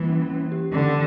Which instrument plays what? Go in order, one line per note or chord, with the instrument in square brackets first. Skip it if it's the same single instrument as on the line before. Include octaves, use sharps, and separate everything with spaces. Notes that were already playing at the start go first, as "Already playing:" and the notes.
Already playing: [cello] E3 [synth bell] G3 A#3
[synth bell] C#4
C#4
G4
[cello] D3 [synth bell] C#4